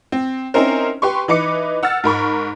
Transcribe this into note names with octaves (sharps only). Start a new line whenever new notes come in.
C4
C4 C#4 D#4 E4 A#4 C5
G4 B4 C6 C#6
E3 D#4 B4 D6 C#7
F#5 E6 F6 A6
G#2 A#4 B5 C#6